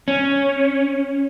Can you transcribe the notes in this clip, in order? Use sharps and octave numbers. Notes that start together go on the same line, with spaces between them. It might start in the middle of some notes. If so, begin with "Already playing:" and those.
C#4